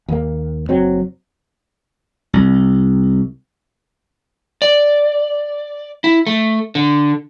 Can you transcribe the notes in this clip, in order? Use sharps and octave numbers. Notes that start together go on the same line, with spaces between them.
D#2 A#3
F#1 F#3 C4
C2
D5
E4
A3
D3